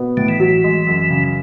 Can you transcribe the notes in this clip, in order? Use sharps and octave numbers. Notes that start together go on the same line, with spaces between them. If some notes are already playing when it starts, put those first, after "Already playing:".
Already playing: B2 B3
A2 D3
E3
F#3
G#3
F#2
C#3